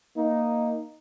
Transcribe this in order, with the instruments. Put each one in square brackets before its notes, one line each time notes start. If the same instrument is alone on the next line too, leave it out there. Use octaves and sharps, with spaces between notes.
[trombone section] A#3 D#4